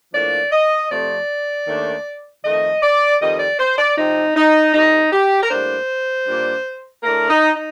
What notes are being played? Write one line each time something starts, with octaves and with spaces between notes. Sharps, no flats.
A2 F3 A#3 D4 D5
D#5
F2 C3 F3 A3 D5
D#2 D#3 A3 D4
F2 D#3 A3 D#5
D5
F2 D#3 G3 D#5
D5
C5
D5
C3 F3 C4 D#4
D#4
F2 C3 G3 D#4
G4
A#4
A2 G3 A#3 D4 C5
A#2 G3 D4
A2 A3 D4 A#4
D#4
D#4